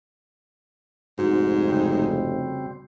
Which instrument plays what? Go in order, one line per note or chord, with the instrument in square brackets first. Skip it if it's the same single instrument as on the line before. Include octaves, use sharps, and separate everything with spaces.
[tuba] F1 [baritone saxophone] G#2 [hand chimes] F#4
[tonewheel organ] C#3 G3 C4